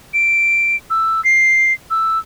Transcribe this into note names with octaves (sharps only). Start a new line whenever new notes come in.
D7
E6
C7
E6